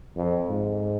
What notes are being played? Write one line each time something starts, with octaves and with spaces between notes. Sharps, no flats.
F2
G#2